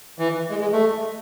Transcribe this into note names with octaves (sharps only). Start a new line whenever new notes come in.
E3
G#3
G#3
A3